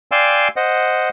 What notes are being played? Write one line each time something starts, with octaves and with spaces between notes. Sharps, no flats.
D5 F5 G5 G#5 C6 E6
C5 D#5 F#5